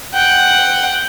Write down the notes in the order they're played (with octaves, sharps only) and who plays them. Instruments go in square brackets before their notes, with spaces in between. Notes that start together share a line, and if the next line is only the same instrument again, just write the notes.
[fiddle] F#5 G5